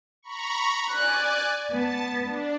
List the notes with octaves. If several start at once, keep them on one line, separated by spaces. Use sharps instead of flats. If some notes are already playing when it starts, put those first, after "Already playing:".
A#5 B5 C#6
D5 G#5 F#6
B3 A5
D4